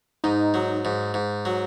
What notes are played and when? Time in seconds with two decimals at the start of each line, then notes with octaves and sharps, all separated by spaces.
0.24 G#2 D#4
0.54 F#3
0.85 G#2
1.14 G#2
1.45 F#3